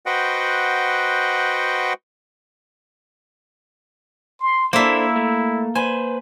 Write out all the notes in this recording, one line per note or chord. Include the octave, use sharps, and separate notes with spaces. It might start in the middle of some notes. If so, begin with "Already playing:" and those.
F#4 B4 C5 D#5 F#5 G5
C6
A#3 D4 E4 A4 C5 E5
A3
B4 C5 G#5